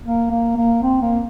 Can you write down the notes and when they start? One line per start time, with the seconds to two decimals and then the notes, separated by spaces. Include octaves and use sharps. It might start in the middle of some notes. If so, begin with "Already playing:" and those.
0.06 A#3
0.31 A#3
0.57 A#3
0.83 C4
1.02 A#3